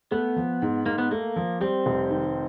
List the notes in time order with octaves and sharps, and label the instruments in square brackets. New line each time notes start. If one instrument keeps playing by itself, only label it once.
[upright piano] A3 [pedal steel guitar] B3
[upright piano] F3
G#2
[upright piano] G#2 [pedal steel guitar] A#3
[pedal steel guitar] B3
[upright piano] A3 [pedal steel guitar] A#3
[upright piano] F3
[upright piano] G3 [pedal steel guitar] C4
[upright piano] F1
D#3